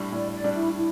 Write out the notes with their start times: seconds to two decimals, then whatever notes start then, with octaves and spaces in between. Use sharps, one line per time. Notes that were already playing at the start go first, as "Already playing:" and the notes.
Already playing: A2 G3 D4
0.12 A2 D5
0.33 D5
0.44 G3 D4
0.54 E4
0.76 E4